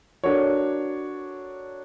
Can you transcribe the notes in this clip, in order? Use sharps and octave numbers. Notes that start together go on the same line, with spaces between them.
D4 F#4 A4 A#4 C#5